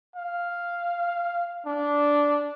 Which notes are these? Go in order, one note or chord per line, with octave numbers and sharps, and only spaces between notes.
F5
D4